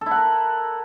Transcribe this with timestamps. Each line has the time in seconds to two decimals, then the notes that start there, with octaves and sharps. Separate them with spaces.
0.01 A4
0.06 E4
0.11 F#5
0.16 A#4